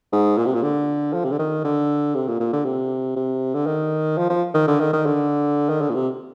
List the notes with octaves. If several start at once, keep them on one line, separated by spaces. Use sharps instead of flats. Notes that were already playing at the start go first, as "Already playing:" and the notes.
G#2
A#2
C3
A#2
D3
F3
C3
D3
D#3
D3
C3
A#2
A#2
D3
C3
C3
D3
D#3
F3
F3
D#3
D3
D#3
D#3
D3
D#3
D3
A#2
C3